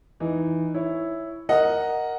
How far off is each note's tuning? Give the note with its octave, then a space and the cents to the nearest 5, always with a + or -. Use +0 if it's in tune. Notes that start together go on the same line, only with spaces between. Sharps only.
E3 +0 D#4 +0
E4 +0 C#5 +0
A#4 +0 D#5 +0 F#5 +0